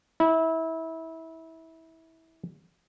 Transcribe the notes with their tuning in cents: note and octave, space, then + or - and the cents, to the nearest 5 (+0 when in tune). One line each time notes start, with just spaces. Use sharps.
E4 -25